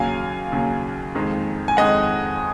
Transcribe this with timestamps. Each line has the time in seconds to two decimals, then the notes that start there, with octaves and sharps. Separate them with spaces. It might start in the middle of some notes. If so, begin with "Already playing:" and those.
Already playing: D#2 C#3 F#3 F5 G#5
0.52 D#2 C#3 F#3
1.15 F2 D#3 G#3
1.68 G#5
1.77 F2 D#3 G#3 D#5 F#5